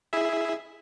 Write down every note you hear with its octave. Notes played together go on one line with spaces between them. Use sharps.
E4 G#4 E5